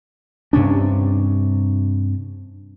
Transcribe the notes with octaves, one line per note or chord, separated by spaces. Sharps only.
G2 C3 C#4 D4